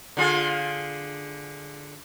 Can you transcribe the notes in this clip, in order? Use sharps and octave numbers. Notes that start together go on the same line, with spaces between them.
D3 F4 G#4